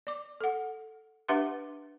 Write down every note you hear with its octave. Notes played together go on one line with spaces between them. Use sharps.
D5 D6
A4 F#5
D4 G4 B4 E5 F#5 C6